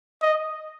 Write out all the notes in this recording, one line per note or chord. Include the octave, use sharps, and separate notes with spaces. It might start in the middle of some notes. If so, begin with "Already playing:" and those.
D#5